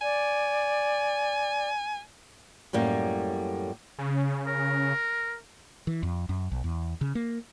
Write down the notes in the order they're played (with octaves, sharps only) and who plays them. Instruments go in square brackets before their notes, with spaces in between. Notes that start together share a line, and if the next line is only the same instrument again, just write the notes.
[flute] D5 [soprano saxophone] G#5
[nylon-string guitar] F#2 A2 G3 A#3
[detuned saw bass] C#3
[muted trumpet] A#4
[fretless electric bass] E3
F2
F#2
B1
E2
C#3
A#3